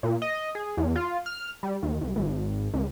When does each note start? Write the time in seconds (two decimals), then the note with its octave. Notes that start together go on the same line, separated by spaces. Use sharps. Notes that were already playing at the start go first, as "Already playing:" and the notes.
0.03 A#2
0.22 D#5
0.55 G#4
0.77 E2
0.96 F4
1.26 F6
1.63 G3
1.83 D#2
2.01 C2
2.16 G#1
2.73 C#2